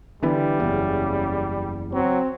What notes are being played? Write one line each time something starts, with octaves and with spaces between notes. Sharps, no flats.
D3 E3 G3 B3
F#1 E2 C#3
F#3 C4